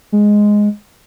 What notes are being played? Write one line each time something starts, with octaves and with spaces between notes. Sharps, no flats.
G#3